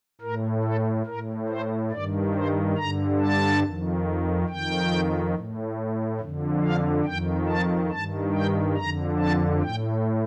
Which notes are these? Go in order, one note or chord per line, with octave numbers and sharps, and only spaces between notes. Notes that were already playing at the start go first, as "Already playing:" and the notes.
A2 A#4
A4
A2 A#4
C5
G2 D#3 D5
C5
G2 D3 A#5
A5
F2 D#3
F2 D#3 G5
A2
F2 D3
F5
F2 D#3 G5
A5
G2 D#3 A5
G5
F2 D3 A#5
A5
A2 G5